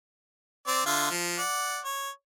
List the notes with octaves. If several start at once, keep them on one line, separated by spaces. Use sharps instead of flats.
C4 D5
D3 F4 E5
F3
D5 F#5
C#5